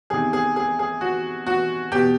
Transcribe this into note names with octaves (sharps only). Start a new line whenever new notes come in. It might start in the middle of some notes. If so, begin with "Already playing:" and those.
E2 C3 D#3 G#4
G#4
G#4
G#4
F#4
F#4
E2 B2 G4